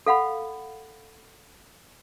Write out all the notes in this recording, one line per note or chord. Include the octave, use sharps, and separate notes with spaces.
A4 F5 F#5 B5